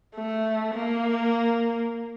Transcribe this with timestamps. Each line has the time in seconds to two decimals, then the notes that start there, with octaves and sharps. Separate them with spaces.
0.16 A3
0.74 A#3